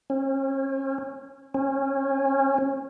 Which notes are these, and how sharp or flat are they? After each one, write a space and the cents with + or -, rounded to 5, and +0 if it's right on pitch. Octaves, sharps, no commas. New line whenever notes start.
C#4 -35
C#4 -25